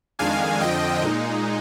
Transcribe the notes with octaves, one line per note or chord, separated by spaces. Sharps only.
F2 D#3 G#3 D4 F5 G#5
F2 D3 F3 D#5 G5
A#2 G#3 D#4